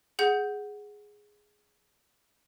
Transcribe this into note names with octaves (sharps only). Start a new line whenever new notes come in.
G#4 F#5 G6